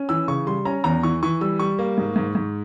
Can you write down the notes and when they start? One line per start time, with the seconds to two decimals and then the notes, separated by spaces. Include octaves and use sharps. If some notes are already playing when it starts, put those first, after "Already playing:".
Already playing: C#4
0.09 E3 E6
0.28 C#3 C#6
0.47 G3 C6
0.65 C#4 A#5
0.84 E2 A#5
1.03 E3 C#6
1.23 E3 C#6
1.41 G3 E6
1.59 G3 C#6
1.79 A#3
1.98 G#2
2.16 G#2
2.35 G#2